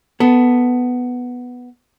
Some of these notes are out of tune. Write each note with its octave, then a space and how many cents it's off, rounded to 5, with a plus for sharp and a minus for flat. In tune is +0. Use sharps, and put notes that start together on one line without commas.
B3 +0 A4 +0